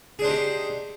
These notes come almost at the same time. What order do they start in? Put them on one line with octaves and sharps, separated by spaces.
G#4 D4 C5 D#4 G4